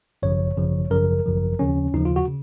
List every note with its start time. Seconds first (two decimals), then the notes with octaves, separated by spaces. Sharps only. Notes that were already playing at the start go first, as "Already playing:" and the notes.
0.22 G#1 F#2 C#3 F3 C#5
0.57 G#1 F#2 C#3 F3
0.91 G#1 F#2 C#3 F3 A#4
1.26 G#1 F#2 C#3 F3
1.59 D#2 C#3 F3 C#4
1.93 D#2 C#3 F3 D#4
2.05 F4
2.16 F#4
2.28 C#3